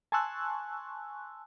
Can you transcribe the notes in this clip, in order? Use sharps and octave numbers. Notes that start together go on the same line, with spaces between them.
G#5 A5 C6 C#6 E6 F#6